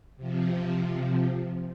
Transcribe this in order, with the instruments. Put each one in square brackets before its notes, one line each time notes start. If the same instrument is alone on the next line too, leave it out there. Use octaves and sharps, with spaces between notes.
[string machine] C3 F3